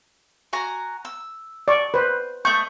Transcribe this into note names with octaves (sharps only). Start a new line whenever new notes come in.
F#4 G#5 A#5
E6
D5 C#6
B4 C5
A3 D#5 C#6 G6